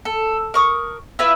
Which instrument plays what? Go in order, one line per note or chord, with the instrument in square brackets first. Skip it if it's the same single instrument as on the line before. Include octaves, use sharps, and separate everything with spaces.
[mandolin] A4
A#4 C#6 D#6
E4 F4 B4 E5